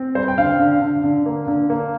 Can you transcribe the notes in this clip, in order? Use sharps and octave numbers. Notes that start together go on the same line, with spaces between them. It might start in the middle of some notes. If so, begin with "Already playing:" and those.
Already playing: C4
G3 C5
G5
D3 F5
D3
D3
D3
A#3
D3
A#3